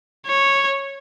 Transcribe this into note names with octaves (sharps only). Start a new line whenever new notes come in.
C#5